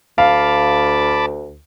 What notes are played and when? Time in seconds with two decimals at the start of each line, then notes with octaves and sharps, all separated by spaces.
0.18 D2 F5 A5 B5 D6